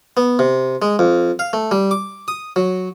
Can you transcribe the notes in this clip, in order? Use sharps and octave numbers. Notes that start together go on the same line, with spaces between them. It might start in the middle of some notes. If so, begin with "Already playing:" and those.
B3
C3
G#3
F2
F5
A3
G3
D6
D#6
F#3